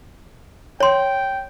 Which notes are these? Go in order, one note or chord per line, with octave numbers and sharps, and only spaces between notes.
C#5 G5 C6